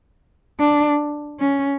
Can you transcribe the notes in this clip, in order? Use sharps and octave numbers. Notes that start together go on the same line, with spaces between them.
D4
C#4